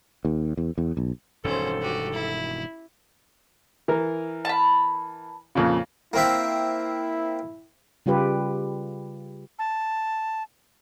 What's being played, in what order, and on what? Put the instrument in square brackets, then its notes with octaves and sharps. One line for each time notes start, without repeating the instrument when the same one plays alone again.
[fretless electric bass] D#2
E2
E2
B1
[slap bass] E1 G2 D#3 [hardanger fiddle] C#4 C5 [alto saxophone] A4
[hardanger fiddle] F#4 G4
E4
[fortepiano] E3 A#4
[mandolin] A5 B5
[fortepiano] F2 A#2 C#3
[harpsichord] A#3 C4 E5 [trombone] E4
[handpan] C#3 G3 F4 G4 B4
[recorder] A5